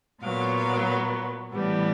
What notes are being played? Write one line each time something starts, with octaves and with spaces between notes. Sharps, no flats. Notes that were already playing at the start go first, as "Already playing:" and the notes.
A#2 F#3 B3 F5
F5
A2 E3 G3 B3